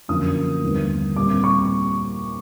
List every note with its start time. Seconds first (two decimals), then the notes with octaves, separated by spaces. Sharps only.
0.08 F#2 D3 F3 A#3 D#6
0.63 D#2 D3 G3 B3
1.16 A#2 G3 C4 D6
1.44 C#6